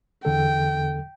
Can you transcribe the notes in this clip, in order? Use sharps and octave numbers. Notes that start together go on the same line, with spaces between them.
E2 D3 A4 G5